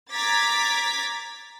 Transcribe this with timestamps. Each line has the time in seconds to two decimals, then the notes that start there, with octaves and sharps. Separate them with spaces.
0.12 A#5 D6 G#6 A6 B6